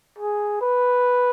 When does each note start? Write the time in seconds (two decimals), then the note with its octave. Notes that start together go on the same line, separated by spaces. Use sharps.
0.19 G#4
0.61 B4